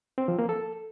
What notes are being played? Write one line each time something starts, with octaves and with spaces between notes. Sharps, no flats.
C4
F3
A#3
A4